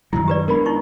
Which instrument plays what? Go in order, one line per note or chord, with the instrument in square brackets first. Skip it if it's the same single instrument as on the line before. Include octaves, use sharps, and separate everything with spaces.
[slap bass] F#2 D#3 F#3 [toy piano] E4
[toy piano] G4 B4 D5
[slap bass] G#3 B3 D4 [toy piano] A#4 B5
[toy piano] D#4 E4 C#6